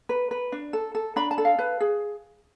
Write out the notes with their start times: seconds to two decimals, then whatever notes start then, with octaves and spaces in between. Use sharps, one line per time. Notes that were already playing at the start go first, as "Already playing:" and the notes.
0.09 B4
0.31 B4
0.52 D4
0.73 A4
0.95 A4
1.16 D4 B5
1.31 A5
1.38 A4
1.45 F5
1.59 B4
1.80 G#4